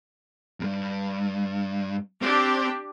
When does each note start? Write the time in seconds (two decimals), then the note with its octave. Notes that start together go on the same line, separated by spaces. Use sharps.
0.60 E2 G2
2.22 C4 D4 G4